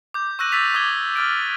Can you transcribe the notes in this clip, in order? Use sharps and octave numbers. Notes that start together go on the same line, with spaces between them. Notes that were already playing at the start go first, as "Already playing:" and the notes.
D6 G6
C#6 E6 F#6 A#6 D#7 F#7
E6 A6 B6 F7
D6 D#6 G#6 G7
E6 F6 A6 D7